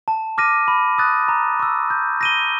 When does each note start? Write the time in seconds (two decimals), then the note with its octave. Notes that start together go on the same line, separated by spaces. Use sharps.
0.08 A5
0.38 D6 F6 A#6 D#7
0.68 B5
0.98 D#6 F#6 A6
1.28 A#5
1.59 C#6 E6
1.90 G6
2.21 A#6 D#7 G7